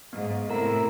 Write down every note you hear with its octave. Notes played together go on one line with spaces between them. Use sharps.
G#2 B3
A2 C3 E4 A4 A#4 A#5